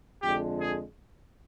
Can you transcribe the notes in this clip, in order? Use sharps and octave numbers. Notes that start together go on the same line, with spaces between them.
F2 D3 G#3 G4
G#4